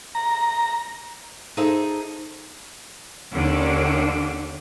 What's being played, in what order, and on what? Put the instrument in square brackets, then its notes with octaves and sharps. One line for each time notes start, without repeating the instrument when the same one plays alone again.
[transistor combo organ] A#5
[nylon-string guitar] D#4 G#4 A4 C5 E5
[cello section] D#2 D3 C#4 D4